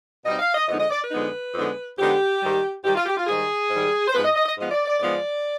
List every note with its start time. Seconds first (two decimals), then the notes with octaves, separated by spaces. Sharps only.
0.25 B2 G3 C4 D#4 D#5
0.39 F5
0.55 D#5
0.68 F2 D3 G#3 B3 D#4 D#5
0.79 D#5
0.90 D5
1.01 B4
1.11 F2 D3 G#3 B3 D#4
1.54 F2 D3 G#3 B3 D#4
1.98 F2 D3 G#3 B3 D#4 G4
2.41 G#2 D#3 G3
2.84 G#2 D#3 G3 G4
2.95 F4
3.06 G4
3.17 F4
3.27 G#2 D#3 G3 G#4
3.70 G#2 D#3 G3
4.08 C5
4.13 G#2 F3 G#3 B3 B4
4.25 D#5
4.36 D#5
4.46 D#5
4.56 G#2 F3 G#3 B3 D#5
4.71 D5
4.86 D5
5.00 G#2 F3 G#3 B3 D5